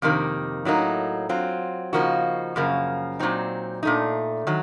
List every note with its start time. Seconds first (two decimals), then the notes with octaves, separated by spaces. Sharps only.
0.02 F2 C3 D#3 A#3
0.65 A2 F#3 A#3 D#4
1.29 F#3 C4 F4
1.93 C#3 F3 A#3 D#4 F#4
2.56 F#2 C#3 F3 A#3
3.19 A#2 F#3 C4 D#4
3.83 A#2 A3 D#4
4.47 D#3 F#3